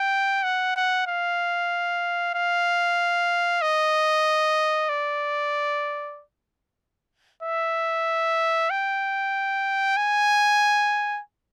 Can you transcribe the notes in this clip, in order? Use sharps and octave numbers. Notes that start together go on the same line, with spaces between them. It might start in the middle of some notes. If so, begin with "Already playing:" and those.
Already playing: G5
F#5
F#5
F5
F5
D#5
D5
E5
G5
G#5